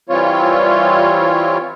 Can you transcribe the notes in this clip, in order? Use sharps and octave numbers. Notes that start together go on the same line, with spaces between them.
E3 G3 C4 F4 C#5